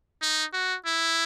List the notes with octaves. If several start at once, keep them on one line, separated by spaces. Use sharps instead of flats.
D#4
F#4
E4